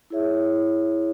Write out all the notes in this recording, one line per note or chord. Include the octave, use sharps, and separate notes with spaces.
E4 G#4 C#5 E5